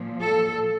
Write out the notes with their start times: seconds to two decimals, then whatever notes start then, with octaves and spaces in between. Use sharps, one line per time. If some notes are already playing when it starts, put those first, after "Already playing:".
Already playing: A#2 F3
0.20 A4